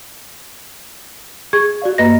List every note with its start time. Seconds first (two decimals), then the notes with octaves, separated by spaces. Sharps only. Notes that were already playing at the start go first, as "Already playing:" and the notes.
1.53 G#4 C#6 G#6
1.82 F#4 D5 F5
1.98 G2 A#3 B4 D#5 A#6